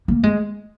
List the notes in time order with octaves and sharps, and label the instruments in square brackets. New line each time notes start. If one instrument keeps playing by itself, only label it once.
[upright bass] A#3
G#3